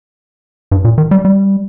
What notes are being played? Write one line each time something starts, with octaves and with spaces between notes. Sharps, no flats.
G2
A#2
D#3
G3
G3